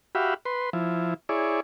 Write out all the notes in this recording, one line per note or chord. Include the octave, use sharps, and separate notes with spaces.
F#4 G4 E5 F5 B5
B4 C6
F3 E4
E4 G#4 C#5 D5